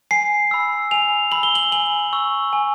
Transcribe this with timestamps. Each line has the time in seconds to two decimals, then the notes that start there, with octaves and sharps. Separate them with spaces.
0.11 G#5 C7
0.51 B5 E6
0.91 G#5 F7
1.32 B5 E6 F#7
1.43 G7
1.55 F#7
1.72 G#5 F#7
2.13 C#6 E6
2.53 G#5